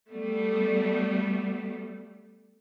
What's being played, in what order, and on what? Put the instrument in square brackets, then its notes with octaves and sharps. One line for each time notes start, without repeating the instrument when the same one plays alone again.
[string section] G3 A3 B3